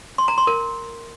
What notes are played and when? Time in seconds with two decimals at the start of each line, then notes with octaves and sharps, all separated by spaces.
0.18 C6
0.28 A#5
0.38 C6
0.47 A#4